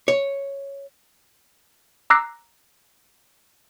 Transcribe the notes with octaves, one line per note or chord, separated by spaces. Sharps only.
C#5
A#5 D6 E6 F#6 A#6 C7